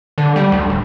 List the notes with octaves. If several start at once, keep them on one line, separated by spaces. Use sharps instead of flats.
D3
G3
D2
D1